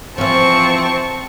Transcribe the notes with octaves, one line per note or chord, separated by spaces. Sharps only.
E3 F3 C4 A5 C#6